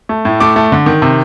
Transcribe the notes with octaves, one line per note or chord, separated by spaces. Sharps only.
A3
A2
A3 D6
A3
D3
D#3
C3